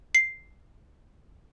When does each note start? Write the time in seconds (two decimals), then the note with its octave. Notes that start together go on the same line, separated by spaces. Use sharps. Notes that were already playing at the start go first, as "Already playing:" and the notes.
0.15 C7